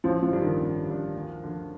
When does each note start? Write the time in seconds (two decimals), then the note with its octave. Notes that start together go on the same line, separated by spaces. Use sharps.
0.04 A1 F3
0.22 F3
0.32 G2 D3 G3 D4
0.41 D#3
0.60 A1
0.88 G2 D3 G3 D4
1.15 D2
1.43 D3 F3